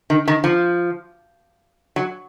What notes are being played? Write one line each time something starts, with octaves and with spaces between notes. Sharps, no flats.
D#3
D#3
F3
F#3